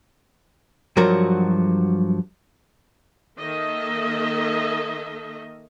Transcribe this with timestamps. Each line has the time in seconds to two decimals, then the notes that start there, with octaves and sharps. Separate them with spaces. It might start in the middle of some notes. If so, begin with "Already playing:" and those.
0.97 G2 F3 F#3 F#4 A#4
3.39 D#3 A#3 A4 D#5 E5